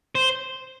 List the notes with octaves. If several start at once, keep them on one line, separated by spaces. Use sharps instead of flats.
C5